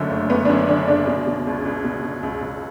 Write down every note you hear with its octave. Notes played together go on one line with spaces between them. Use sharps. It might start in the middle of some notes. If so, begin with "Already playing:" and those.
Already playing: F#1 F#2 D3 A3
F#1
F#1 B3
D4
F#2 C#4
D3 D4
F#1 D4
B2
B2
C#2
C#2
B2
B2
C#2
C#2